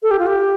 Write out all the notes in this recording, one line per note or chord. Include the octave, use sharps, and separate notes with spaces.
A4
G4
F4
G4